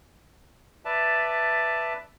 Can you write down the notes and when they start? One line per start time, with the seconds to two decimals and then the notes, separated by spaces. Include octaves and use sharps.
0.85 B4 D5 E5 A5